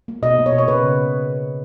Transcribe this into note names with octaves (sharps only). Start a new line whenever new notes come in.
A#3
B2 D#5
A#3
C#5
B2
C#5
C#3 B4